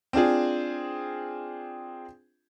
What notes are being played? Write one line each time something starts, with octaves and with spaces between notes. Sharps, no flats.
C4 D4 F4 G#4